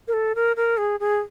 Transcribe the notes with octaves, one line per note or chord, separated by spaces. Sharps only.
A#4
A4
A#4
A#4
G#4
G#4